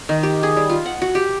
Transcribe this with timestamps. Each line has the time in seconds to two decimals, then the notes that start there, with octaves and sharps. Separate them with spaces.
0.09 D#3
0.23 G4
0.43 G#4
0.56 G3
0.69 F4
0.86 F#5
1.02 F#4
1.15 G4